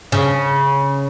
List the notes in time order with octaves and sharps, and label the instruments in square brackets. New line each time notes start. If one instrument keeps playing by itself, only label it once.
[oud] C#3